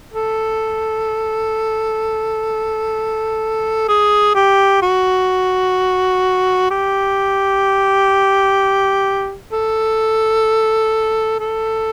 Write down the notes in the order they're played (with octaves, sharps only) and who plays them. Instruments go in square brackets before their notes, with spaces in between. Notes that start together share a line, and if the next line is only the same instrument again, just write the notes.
[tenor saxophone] A4
G#4
G4
F#4
G4
A4
A4